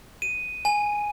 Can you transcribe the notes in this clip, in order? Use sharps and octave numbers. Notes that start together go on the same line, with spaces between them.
D#7
G#5